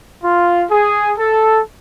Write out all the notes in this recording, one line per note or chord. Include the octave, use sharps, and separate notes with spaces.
F4
G#4
A4